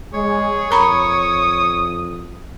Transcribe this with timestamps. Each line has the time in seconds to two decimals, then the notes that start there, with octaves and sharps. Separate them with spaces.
0.13 G#3 G#4 C#5
0.71 F2 A#4 A#5 B5 D#6